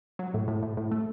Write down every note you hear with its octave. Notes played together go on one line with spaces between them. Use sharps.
F#3
A2
A2
A2
A2
A3